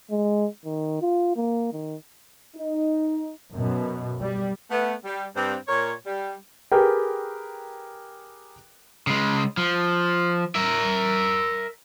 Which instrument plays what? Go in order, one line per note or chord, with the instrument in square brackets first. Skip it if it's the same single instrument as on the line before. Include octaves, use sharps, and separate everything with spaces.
[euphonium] G#3
D#3
F4
A#3
D#3
[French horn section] D#4
[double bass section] F#2 B2
G3
[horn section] A3 B3
G3
G2 C4
A#2 A#4 C#5
G3
[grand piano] G4 G#4 A#4 B4 G5
[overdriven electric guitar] C#3 G#3
F3
A#4 E5